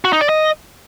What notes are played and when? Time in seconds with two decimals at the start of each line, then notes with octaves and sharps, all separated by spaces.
0.05 F#4
0.13 D#4
0.21 D5
0.29 D#5